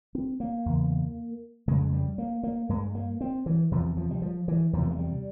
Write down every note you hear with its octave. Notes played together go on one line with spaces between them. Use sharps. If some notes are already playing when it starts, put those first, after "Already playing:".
C4
A#3
E2 C#3
F2 C#3 G#3
G3
A#3
A#3
G2 G#3
A#3
C4
E3
E2 C3 F3
F3
G3
F3
E3
E2 C3 F3
A#3
G#3
G3